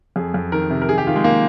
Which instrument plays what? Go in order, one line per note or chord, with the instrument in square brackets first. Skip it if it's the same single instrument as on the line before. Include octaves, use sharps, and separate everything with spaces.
[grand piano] F2 G#4
F2
D#3 A#4
C3
A#4
D#3 G#4
G4
D#3 F4
G#3
D#3 A#3